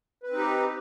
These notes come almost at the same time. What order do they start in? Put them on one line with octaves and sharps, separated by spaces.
B4 C4 D#4 G4